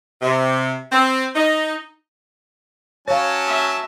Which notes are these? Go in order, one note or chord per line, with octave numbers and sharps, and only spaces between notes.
C3
C4
D#4
F#3 C#4 C#5 F5 A5
E5